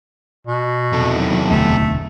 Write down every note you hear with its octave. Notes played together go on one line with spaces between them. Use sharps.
B2
E2 C3 D#3 F#3 A4
E1 D2 D3 A3